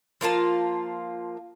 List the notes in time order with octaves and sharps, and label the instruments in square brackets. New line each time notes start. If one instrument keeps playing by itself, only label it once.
[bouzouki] F3 A#3 F4 A5